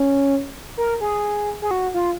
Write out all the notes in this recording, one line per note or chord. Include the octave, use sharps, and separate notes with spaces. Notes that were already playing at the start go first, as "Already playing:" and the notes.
Already playing: C#4
A#4
G#4
G#4
F#4
F4